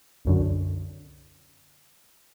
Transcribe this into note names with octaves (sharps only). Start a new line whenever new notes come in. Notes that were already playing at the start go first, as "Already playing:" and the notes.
C2 F#2 D3